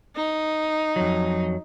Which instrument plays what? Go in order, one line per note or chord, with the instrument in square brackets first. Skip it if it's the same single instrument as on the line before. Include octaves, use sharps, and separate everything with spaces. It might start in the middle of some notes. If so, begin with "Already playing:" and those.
[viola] D#4
[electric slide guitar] F2 F#3